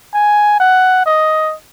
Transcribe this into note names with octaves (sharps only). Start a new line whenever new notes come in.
G#5
F#5
D#5